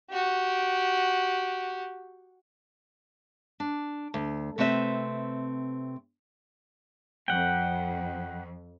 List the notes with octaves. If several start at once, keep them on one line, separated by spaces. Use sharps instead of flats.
F#4 G4
D4
D2
C3 A3 C4 B4 E5
F2 F#5 G5